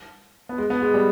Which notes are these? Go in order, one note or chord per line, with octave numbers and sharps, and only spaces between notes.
B3
G#3
B3
G#3
G3